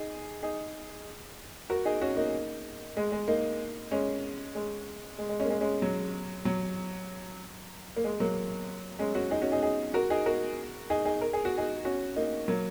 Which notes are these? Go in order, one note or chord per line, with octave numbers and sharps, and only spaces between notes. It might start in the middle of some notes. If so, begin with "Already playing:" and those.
Already playing: D#4 G#4
D#4 G#4
F#4 A#4
D#4 G#4
C#4 F#4
A#3 D#4
G#3
G#3
A#3 D#4
G#3 C#4
G#3
G#3
G#3
G#3 C#4
A#3
G#3 C#4
G#3 C#4
F#3
F#3
A#3
G#3
F#3 A#3
G#3 C#4
C#4 F#4
D#4 G#4
C#4 F#4
D#4 G#4
D#4 G#4
F#4 A#4
D#4 G#4
F#4 A#4
D#4 G#4
D#4 G#4
A#4
G#4
F#4
D#4 G#4
C#4 F#4
A#3 D#4
F#3 A#3